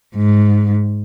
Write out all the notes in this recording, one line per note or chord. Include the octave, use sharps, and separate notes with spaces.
G#2